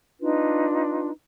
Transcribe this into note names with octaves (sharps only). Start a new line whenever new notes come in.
D4 D#4 F4 B4